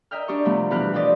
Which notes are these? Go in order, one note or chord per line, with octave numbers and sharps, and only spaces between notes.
A#4 D#5 E5 G5 F6
D4 G4 C#6
C3 F3 G3 A3 B3
B2 E3 G4 B4 F6 F#6
F3 G4 C5 D5 D#5